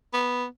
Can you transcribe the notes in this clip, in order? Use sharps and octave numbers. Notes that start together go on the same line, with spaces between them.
B3